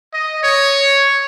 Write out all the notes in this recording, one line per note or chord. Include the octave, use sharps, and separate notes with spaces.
D#5
C#5